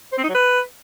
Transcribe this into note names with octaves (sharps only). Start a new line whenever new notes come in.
C5
C4
D#4
F#3
B4